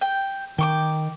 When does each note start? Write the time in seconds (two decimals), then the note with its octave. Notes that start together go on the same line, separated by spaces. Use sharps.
0.01 G5
0.58 D#3 G5 C#6 D6